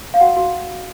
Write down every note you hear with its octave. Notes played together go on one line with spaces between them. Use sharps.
F5
F#4 F#5
F#4